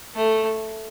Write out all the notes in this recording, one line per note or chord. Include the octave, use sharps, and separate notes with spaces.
A3